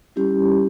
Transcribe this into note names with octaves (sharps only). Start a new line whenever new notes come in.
G3 C#4 E4 G4